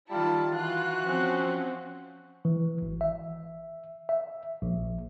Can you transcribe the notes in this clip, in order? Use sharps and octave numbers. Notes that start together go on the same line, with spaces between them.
D#3 G3 E4 F4 A5
E3 F4 F#4 F#6
F3 C4 C#4
E3
G#1
E5
E5
A#1